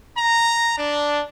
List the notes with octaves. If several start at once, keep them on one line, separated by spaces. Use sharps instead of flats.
A#5
D4